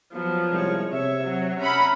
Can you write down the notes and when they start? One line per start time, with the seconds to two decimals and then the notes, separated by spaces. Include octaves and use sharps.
0.13 F3 F#3 B3
0.51 C2 G#3 C#5
0.92 C3 C#5 E5
1.24 F#3
1.60 C#4 E5 F#5 A#5 B5